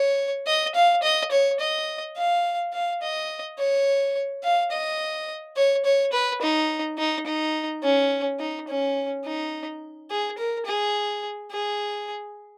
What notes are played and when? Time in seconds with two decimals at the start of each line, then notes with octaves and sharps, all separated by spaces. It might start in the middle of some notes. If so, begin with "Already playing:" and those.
Already playing: C#5
0.47 D#5
0.75 F5
1.03 D#5
1.31 C#5
1.60 D#5
2.17 F5
2.73 F5
3.02 D#5
3.58 C#5
4.43 F5
4.71 D#5
5.56 C#5
5.85 C#5
6.13 B4
6.42 D#4
6.98 D#4
7.26 D#4
7.83 C#4
8.39 D#4
8.68 C#4
9.25 D#4
10.10 G#4
10.38 A#4
10.66 G#4
11.51 G#4